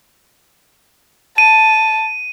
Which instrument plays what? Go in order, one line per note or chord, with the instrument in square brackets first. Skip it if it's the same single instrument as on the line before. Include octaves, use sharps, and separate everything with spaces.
[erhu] A5 [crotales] D#7